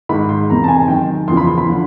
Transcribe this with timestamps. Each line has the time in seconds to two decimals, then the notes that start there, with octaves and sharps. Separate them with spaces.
0.09 G#2 D#3 B5
0.29 C6
0.50 E2 C3 E3 A#5
0.64 A5
0.68 G#5
0.88 F#2 D#3 G5
1.28 E2 C#3 F3 C6
1.37 B5
1.47 C6
1.58 B5
1.67 D3 F3